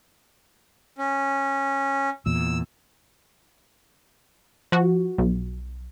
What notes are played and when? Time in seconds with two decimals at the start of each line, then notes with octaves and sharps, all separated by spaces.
0.98 C#4
2.26 E2 A#2 E6
4.72 F3 F#4
5.18 B1